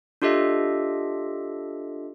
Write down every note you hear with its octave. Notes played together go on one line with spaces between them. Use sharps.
D4 F4 G4 A4 D#5 E5